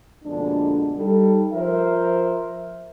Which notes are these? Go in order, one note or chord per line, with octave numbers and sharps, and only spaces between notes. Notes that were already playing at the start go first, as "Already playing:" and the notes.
F2 B2 D3 G#3 A#3 D4
G3 D#4 A4
F3 A#4 C5 E5